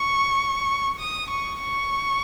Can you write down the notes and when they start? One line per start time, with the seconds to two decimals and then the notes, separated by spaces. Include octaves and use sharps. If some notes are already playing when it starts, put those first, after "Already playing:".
Already playing: C#6
0.99 D#6
1.30 C#6
1.61 C#6